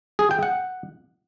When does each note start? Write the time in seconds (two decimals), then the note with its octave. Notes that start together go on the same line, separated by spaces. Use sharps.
0.19 G#4
0.31 G5
0.43 F#5